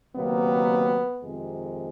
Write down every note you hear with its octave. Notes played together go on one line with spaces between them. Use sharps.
C#2 C3 D#3 F#3 A#3 B3
F2 C3 D#3 G#3